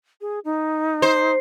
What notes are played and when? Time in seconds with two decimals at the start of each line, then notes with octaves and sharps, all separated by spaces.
0.21 G#4
0.45 D#4
1.02 C5